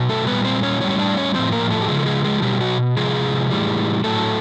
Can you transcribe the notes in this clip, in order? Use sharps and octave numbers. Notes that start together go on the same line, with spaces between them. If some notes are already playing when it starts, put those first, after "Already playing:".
Already playing: B2 F#3
A3 A4
A#2 G3 B3 B4
C4 C5
C#4 C#5
A2 E3 G3 C#4 C#5
C#5
D4 D5
C#4 C#5
A2 F3 C4 C5
A#3 A#4
A3 A4
G4
C#3 F3 G#3 G#4
A4
G#3 G#4
G#3 G#4
B2 F#3 G3 G4
F#3 F#4
C3 F3 G#3 G#4
A2 E3 G3
A2 F#3 A3 A4